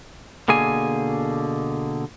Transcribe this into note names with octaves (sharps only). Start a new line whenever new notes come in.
B2 D3 A#3 G#4 G#5